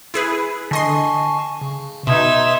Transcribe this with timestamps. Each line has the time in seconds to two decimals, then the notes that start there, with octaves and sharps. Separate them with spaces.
0.14 E4 G#4 B4
0.71 D3 D#5 G#5 A5 C6 C#6
1.61 C#3
2.07 B2 D#4 E5 C6 D#6 G#6